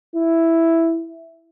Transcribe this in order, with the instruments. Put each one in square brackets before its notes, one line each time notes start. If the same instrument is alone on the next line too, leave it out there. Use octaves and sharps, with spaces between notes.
[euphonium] E4